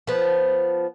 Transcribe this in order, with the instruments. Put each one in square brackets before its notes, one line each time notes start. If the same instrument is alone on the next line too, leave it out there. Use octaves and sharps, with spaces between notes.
[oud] F3 B3